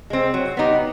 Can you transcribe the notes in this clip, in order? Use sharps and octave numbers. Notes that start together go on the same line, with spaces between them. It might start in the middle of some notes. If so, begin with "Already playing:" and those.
G#3 C4
F#3
B3 D#4 G4